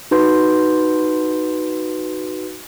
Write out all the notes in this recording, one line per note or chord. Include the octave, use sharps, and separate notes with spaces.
D#4 F#4 B4 C6 G6